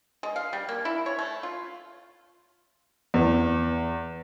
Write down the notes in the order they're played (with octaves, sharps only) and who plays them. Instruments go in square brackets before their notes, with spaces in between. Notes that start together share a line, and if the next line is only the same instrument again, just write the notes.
[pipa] G#3
F5
G3
A#3
E4
C#5
A3
F4
[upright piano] E2